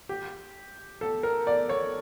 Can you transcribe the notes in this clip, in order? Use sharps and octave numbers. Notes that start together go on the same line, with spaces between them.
G4
A4
A#4
D5
C#5